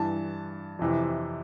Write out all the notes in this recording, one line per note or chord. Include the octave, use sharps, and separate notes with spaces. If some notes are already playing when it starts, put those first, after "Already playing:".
Already playing: G2 E3 A5
F2 C3 E3